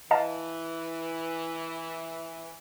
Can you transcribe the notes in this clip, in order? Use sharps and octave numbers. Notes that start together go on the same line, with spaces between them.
E3 D#5 F5 A5